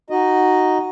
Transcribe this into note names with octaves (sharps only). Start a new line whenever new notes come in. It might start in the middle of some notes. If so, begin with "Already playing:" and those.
D#4 F#4 D#5